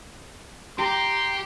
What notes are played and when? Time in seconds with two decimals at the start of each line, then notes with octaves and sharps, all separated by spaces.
0.79 G4 A#5 C6